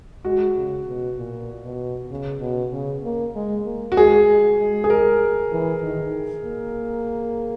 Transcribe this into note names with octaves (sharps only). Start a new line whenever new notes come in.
G#3 F#4
C#3
B2
A#2
B2
C#3
B2
C#3
A#3
G#3
A#3
F#4
G#3 G#4
G#3
G#3
G#4
G#3 A#4
E3
D#3
A#3